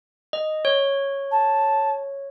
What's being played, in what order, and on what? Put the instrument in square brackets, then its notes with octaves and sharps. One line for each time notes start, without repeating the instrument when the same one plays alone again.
[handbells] D#5
C#5
[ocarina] A5